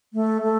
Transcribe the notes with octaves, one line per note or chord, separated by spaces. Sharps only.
A3
A3